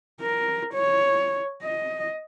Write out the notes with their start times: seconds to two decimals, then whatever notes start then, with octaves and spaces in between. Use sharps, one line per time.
0.21 A#4
0.74 C#5
1.62 D#5